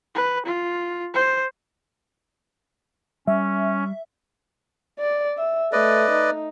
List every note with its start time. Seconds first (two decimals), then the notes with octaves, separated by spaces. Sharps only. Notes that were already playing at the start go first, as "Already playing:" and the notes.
0.15 B4
0.46 F4
1.14 C5
3.27 G3 C#4 E5
5.00 D5
5.38 E5
5.72 A3 B4 D5 D#5
6.11 D#4